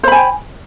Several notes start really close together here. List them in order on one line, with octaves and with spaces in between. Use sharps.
C5 B5 G#5 G5